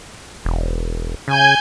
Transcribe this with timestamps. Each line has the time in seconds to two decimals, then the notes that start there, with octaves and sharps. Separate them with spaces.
0.45 E1
1.28 C#3 G#5 G6 G#6